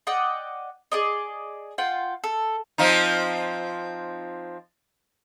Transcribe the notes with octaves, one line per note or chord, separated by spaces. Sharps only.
D5 D#5 F#5 G5
G#4 D5 D#5
F4 F#5 G5
A4
F3 C4 D#4